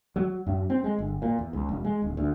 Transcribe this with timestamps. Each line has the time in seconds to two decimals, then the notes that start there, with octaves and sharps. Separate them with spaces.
0.16 F#3
0.46 F#2
0.70 C4
0.84 G#3
0.99 G1
1.22 A#2
1.39 E2
1.53 C#2
1.69 E1
1.84 G#3
2.02 D1
2.17 D2